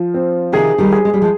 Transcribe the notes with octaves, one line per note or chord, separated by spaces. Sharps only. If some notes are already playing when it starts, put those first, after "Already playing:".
Already playing: F3
C4
C3 D#3 G#4
D#3 G3
G#4
G#3
G3
F3 G#3